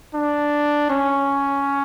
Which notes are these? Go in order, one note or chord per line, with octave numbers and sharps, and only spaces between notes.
D4
C#4